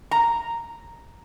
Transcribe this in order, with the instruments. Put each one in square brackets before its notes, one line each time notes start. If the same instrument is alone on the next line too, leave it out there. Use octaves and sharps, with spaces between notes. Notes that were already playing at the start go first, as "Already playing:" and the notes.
[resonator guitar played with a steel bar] A#5